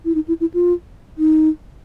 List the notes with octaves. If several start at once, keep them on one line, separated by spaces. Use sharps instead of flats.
E4
D#4
E4
E4
F4
D#4